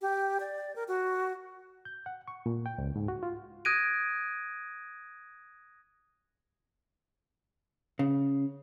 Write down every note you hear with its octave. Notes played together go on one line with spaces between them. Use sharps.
G4
D5
A#4
F#4
G6
F#5
C#6
A#2
G5
C#2
G#2
F#4
F4
D#6 F#6 G#6 A#6 D7 D#7
C#3